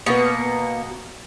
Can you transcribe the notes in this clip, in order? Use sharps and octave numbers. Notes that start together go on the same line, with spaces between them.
B2 A#3 B3 C#7